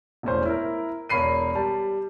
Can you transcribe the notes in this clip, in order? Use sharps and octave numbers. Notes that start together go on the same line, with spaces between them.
E1 A2 C#4 C5
E4 A#4
E1 A#4 C#5 B5 C7 D#7
G3 A5